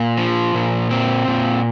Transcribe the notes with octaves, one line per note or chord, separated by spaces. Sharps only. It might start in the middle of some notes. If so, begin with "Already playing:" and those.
Already playing: A#2
F3
A#2
C4
A#2